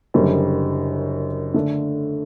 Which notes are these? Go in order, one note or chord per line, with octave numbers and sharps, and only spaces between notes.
F#1 F#2 D3 G3
D3 A3 D4